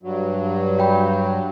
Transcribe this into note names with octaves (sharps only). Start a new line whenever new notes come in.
G2 F#3
F#4 G5 B5